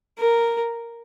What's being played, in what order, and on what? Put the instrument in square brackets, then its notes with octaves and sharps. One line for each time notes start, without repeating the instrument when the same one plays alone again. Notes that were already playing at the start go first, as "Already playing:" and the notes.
[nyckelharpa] A#4